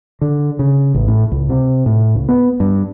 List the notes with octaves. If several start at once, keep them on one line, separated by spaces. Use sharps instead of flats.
D3
C#3
A1
A2
C#2
C3
A2
C#2
B3
G2